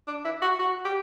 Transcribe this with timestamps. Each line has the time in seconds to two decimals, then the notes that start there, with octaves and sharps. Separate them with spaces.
0.08 D4
0.25 E4
0.42 F#4
0.59 F#4
0.85 G4